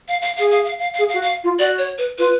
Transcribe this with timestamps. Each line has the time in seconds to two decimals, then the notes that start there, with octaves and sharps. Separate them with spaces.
0.08 F5
0.22 F5
0.36 F5
0.39 G#4
0.51 F5
0.65 F5
0.79 F5
0.94 F5
0.98 G#4
1.09 F5
1.14 F#4
1.22 F5
1.44 F4
1.58 F#4 D5
1.78 C#5
1.98 B4
2.18 F4 B4